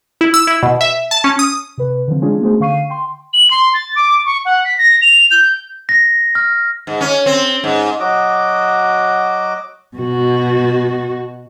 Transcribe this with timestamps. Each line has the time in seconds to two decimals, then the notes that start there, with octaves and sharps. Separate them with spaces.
0.21 E4
0.34 E6
0.47 E4
0.63 B2
0.81 E5
1.11 A5
1.24 C#4
1.39 D#6
1.78 C3 B4
2.08 D3 E3 F3 C4
2.21 G#3 C#4 D4 F4 G#4
2.41 A3 B3 C#4 F#4 G#4 C5
2.60 D3 F5 C#6 C7 D#7
2.90 G5 C6
3.33 F#7
3.50 C6
3.74 A6
3.95 D6
4.26 C#6
4.45 F#5
4.64 B6
4.78 A#6
5.01 F7
5.31 G6
5.89 A#6
6.35 F6
6.87 G#2
7.01 C#4
7.26 C4
7.64 G#2
8.00 F#3 F#4 D#5 D6
9.97 B2 F#4